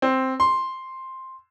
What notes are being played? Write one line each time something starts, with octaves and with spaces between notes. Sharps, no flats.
C4
C6